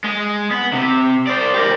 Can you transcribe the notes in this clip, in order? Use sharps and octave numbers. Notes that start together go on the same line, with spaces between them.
G#3
B3
C3
C5 D5
G4 A#4